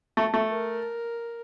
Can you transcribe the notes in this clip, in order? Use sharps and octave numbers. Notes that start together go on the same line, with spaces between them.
A3
A3
A#4